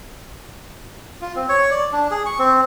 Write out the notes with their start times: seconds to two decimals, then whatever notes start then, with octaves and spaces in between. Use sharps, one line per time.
1.21 F4
1.36 C4
1.49 C#5
1.71 D5
1.93 D4
2.11 G#4
2.26 C#6
2.39 C4